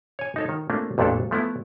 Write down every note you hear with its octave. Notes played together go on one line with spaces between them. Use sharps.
C#5 G#5
D#4 A4 C#5
D#3
A3 A#3 C4 D4 F4
A1 F2 A#2 A3 D4 A4
F3 A3 B3 E4